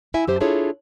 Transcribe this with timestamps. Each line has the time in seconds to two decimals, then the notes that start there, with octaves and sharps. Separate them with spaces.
0.14 E4 E5 G#5
0.28 F#2 G4 C5 E5
0.40 D4 E4 F4 G#4 A4 C#5